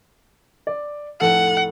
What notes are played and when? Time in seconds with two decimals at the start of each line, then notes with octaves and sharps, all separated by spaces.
0.67 D5
1.21 F1 A2 A4 F#5